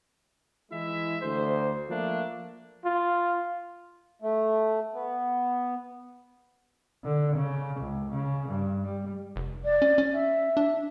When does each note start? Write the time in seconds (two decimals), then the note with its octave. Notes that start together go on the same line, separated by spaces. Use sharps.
0.72 E3 G#3 E4 E5
1.22 D2 C5
1.89 F3 A3 A#3 D4
2.85 F4
4.22 A3
4.93 B3
7.04 D3
7.36 C#3
7.80 C#2
8.13 C#3
8.48 G2
8.84 G3
9.36 F1
9.64 D5
9.82 C#4
9.98 C#4
10.13 E5
10.57 D4